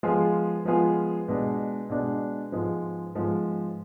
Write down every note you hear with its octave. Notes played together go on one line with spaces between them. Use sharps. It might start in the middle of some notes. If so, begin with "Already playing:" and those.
F3 G#3 B3 F4 G#4
F3 G#3 B3 F4 G#4
B2 G#3 D4
B2 G#3 D4
G#2 F3 G#3 B3
G#2 F3 G#3 B3